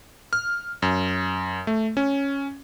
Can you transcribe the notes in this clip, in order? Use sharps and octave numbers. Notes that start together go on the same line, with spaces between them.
F6
F#2
A3
C#4